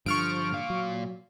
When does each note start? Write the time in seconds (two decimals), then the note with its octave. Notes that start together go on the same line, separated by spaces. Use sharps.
0.06 G2 D3 F3 C#6 F6 D7
0.53 A#2 F5
0.70 F#3